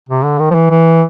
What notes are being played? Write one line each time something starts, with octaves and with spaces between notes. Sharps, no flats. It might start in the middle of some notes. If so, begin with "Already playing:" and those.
C3
D3
D#3
F3
E3
E3